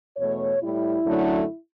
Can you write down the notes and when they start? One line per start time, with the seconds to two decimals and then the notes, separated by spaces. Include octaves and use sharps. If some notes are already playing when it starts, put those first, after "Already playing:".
0.17 E2 B2 A3 C#5
0.62 A2 G3 E4
1.06 F#2 D3 F#3 A3